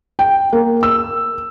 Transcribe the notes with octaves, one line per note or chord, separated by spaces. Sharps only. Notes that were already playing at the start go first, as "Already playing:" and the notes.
G5
A#3
E6